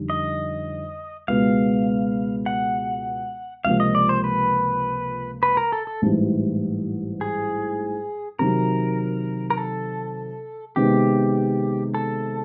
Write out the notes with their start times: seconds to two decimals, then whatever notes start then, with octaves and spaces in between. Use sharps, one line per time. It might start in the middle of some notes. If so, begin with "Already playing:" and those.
Already playing: F2 D3 G3 D#4
0.10 D#5
1.28 C#2 B2 G#3 B3 F5
2.46 F#5
3.65 C#2 C3 F3 A#3 F5
3.80 D#5
3.95 D5
4.09 C5
4.24 B4
5.43 B4
5.57 A#4
5.72 A4
5.87 A4
6.02 A1 G#2 E3 G3
7.21 G#4
8.39 C3 D#3 F#3 A#4
9.50 A#4
9.58 A4
10.76 C3 D#3 G#3 B3 G4
11.95 A4